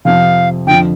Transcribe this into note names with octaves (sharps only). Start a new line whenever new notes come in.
F2 C3 F3 F5
F2 D3 F3 G5